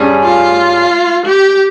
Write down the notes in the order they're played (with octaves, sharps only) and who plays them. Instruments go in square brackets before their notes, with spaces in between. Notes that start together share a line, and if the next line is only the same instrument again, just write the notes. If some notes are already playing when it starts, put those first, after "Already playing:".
Already playing: [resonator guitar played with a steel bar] G2 G3 C#4 G#4
[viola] F4
G4